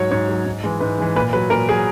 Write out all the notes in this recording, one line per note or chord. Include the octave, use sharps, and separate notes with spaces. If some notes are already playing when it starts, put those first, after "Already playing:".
Already playing: G#2 F#3 C#5
G#2 C#5
F#3
G#2
E3 G#3
G#2 B4
E3 G#3
A#2 B4
F#3 B4
A#2 A#4
F#3 G#4